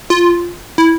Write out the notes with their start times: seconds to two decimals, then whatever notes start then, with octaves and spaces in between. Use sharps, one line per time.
0.10 F4
0.78 E4